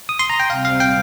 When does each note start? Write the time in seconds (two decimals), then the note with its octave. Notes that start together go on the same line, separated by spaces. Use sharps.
0.09 D#6
0.19 C6
0.30 A#5
0.40 G5
0.50 C3 G3 C4 F5
0.65 F5
0.80 G5